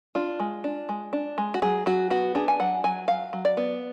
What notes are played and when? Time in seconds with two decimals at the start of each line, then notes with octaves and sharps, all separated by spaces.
0.15 D4 F4
0.40 G#3
0.64 D4
0.89 G#3
1.13 D4
1.38 G#3
1.54 F#4
1.62 F#3 G#4
1.86 F#3 F#4
2.10 B3 F#4
2.35 D4 G#4
2.48 G#5
2.60 F#3 F#5
2.84 F#3 G#5
3.08 F#3 F5
3.33 F#3
3.45 D5
3.57 B3